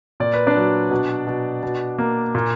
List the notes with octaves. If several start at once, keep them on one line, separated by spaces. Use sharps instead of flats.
A#2 D5
B4
D4 D5
F#3
B2
B2
B2
A#3
A#2